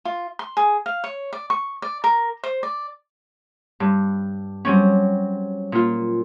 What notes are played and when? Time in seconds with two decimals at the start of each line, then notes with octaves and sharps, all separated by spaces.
0.05 F4
0.39 C6
0.57 G#4
0.86 F5
1.04 C#5
1.33 D5
1.50 C#6
1.82 D5
2.04 A#4
2.44 C5
2.63 D5
3.80 G2
4.65 F#3 G3 C4 C#4
5.72 A#2 F4